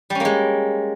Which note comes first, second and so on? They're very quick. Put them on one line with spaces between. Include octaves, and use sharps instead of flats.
G3 C#4 A#3 G#3